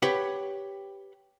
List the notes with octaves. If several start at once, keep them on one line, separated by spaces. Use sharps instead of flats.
G4 B4 C#5 F#5